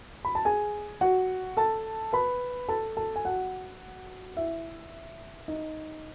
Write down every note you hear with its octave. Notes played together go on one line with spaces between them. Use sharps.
B5
A5
G#4 G#5
F#4 F#5
A4 A5
B4 B5
A4 A5
A4 A5
G#5
F#4 F#5
E4 E5
D#4 D#5